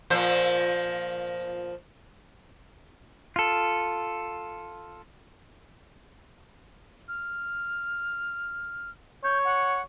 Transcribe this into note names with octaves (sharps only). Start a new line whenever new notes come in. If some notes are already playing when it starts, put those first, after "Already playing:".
A#2 F3 C5
F4 A4
F6
C#5 G6
F#5